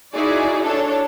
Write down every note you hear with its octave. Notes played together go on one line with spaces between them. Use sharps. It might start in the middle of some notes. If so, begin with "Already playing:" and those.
D#4 E4 F#4 G#4 D5
D4 A4 C#5